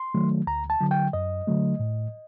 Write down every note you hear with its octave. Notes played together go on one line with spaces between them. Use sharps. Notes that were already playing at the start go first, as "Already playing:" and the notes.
Already playing: C6
D#3 F#3 A3
D2 A#5
A5
D3 F#3
G5
F#2 D#5
D3 F#3 A3
A2